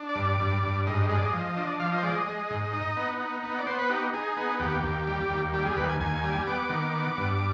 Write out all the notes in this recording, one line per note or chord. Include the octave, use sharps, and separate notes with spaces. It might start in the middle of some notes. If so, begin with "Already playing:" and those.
Already playing: D4
D5
G2
D5
G2
G2
G#2 D#5
G#3 D#5
D5
D#5
F3
D4
F3 F5
D#5
C5
G#3 D5
D#5
G#3
G#2
D#4
B3
D#4
B3
D5
B3 C5
B4
D#4 G4
D#4 G#4
B3
D#2 G4
D#2
G3
D#2
G3 G4
G#4
D#2 B4
G#5
D#2 G#5
G3
B3 D6
D#3
B3
G2